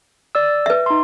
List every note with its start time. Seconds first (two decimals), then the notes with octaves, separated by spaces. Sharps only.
0.35 D5 E6
0.66 B4 E5
0.86 D#4 C6